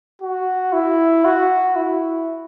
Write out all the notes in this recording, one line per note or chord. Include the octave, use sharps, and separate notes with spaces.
F#4
E4
F#4
E4